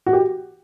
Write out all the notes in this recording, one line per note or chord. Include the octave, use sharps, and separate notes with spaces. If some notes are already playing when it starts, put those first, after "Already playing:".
F#4
G4